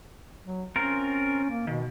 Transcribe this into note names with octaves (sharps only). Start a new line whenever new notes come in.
F#3
C4 C#4 F4 A#4
A#3
B2 D#3